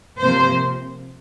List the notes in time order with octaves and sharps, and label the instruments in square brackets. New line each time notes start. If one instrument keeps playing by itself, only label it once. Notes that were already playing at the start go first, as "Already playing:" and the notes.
[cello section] C3 F3 A#3 C5